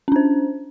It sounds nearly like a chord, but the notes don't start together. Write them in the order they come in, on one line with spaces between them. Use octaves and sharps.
C#4 D4 C5